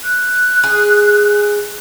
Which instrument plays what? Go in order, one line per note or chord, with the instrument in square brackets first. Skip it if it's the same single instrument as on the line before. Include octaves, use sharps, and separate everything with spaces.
[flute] F#6
[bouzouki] G#4